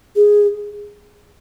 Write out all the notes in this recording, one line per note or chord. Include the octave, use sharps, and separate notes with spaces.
G#4